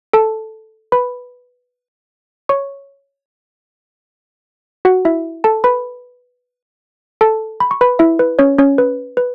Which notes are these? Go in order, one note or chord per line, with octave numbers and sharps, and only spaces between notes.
A4 A5
B4 B5
C#5 C#6
F#4 F#5
E4 E5
A4 A5
B4 B5
A4 A5
B5
C#6
B4 B5
E4 E5
B4
C#4 C#5
C#4 C#5
B4
B4